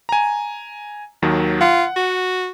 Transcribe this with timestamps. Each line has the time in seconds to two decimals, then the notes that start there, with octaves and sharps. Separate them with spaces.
0.09 G#5 A#5
1.22 D#2 D#3 F#3
1.61 F4 F#5
1.96 F#4